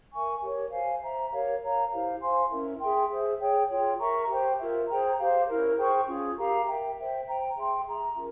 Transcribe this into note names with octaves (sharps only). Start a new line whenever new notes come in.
A#4 E5 G#5 C#6
G4 A#4 C#5
C5 F5 G#5
C5 E5 A#5
G4 A#4 C#5 F5
A#4 C#5 F5 A#5
E4 G4 C5 F5
C5 F5 G#5 C6
C#4 E4 A#4 E5
G#4 E5 G5 C6
G#4 C5 E5
G#4 C#5 G5
F4 G#4 C#5 G5
A#4 E5 A#5 C#6
G4 C5 G5
F4 A#4 E5
G#4 C5 G5 A#5
G4 C5 F5
C#4 E4 A#4
G#4 C5 G5 C#6
C#4 F4 G#4
G4 A#4 F5 A#5
A#4 E5 G5
C5 E5 G5
C5 G5 A#5
G#4 E5 G5 C6
G#4 E5 A#5
C#4 F4 A#4